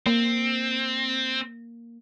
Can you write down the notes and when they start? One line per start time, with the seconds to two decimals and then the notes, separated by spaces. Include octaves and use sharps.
0.06 A#3 C4